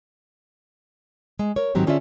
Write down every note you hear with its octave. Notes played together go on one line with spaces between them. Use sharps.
G#3
A#4 C#5
G#2 D#3 F#3 C4 G4
D3 C#4 F4 G#4 D5 E5